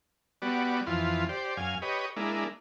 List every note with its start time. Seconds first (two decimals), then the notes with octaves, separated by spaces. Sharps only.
0.42 G3 B3 F#4 D5
0.87 F2 E3 F4 C6
1.29 G4 C5 D5
1.57 F#2 F5 G#5
1.82 G4 B4 C#5 D#5
2.16 G#3 A#3 D4 E4